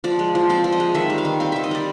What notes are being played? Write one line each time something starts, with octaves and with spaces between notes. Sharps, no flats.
F3 D5
G#3
F3
C4 D5
F3
D#5
G#3
D#3 E5
G3
F5
D#3
C4 F5
D#3 E5
D#5
G3 D5